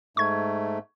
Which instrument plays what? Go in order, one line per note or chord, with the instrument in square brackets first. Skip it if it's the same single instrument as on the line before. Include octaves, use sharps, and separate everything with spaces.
[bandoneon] G#2 A3 [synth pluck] C#6 G#6